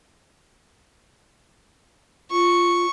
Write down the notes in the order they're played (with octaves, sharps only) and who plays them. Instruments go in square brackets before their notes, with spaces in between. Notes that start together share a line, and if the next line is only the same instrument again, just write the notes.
[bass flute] F4 [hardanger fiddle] C#6